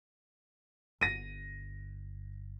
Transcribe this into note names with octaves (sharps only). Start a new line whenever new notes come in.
G1 A#6 D#7